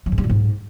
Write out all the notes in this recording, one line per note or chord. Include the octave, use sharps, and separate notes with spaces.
F#3
G#2
G3
A#2
G#2